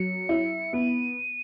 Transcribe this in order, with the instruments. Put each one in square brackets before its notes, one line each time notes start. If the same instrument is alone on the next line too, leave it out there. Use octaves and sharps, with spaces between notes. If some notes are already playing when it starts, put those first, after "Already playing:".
Already playing: [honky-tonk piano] F#3 [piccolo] C#7
[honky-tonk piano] E4
[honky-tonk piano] B3 [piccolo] D#7